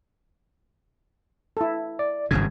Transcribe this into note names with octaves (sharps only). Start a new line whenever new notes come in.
E4 A4
D5
G#1 G2 C#3 G#6